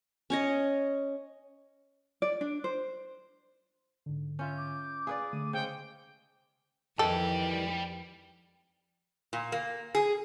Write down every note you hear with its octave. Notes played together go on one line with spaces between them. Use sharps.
C#4 C#5 D#5
D5
D4
C5
G#2 D3
C#4 F4 E5 G6
D6
G#4 B4 D5 F5
D3 A3 D#7
C#3 G#3 C5 G5 G6 C#7
F2 D#3 E3 G3 G4 A4
A#2
A#3
G#4